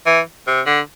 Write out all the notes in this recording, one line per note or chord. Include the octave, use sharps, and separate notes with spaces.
E3
C3
D3